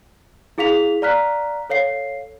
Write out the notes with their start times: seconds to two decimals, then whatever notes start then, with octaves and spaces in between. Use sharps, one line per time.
0.58 E4 G#4 F5 B6 F7
1.02 D5 F5 A#5 F6 F#6 B6
1.70 A4 C#5 F5 C7